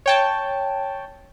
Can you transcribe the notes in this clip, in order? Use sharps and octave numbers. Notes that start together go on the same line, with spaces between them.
C#5 G5 A5